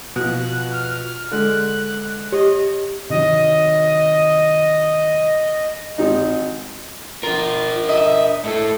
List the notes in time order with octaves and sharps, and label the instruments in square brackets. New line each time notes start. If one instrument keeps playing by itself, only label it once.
[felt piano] B2 F3 [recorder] F#6
[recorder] F6
[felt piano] D3 G#3 [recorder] F#6
[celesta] G4 [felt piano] C#5 [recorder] D#5
[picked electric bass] C3 D#3 F#3 [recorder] D#5
[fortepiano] G#1 D#4
[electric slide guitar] D4 A#4 [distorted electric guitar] F4 C6
[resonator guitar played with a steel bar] D#5 [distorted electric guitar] E5
[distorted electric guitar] A2 A4